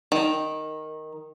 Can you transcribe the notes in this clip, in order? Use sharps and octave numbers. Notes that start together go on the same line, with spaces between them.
D#3